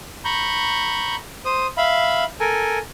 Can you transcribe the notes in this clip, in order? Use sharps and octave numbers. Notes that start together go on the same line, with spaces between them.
A#5 B5 C#6 G6
C5 D#6
E5 F5 B5
A4 A#4 G#5